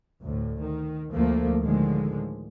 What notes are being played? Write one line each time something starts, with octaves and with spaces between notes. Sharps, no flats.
D2 A2
D#3
D2 F3 A3 A#3
A2 D3 D#3 F3 G#3